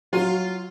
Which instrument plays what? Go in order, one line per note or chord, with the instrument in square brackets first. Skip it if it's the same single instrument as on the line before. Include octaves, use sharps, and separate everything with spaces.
[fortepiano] F#3 [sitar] F4